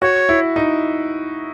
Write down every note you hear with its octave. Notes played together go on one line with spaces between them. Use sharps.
F#4 C#5
E4
D#4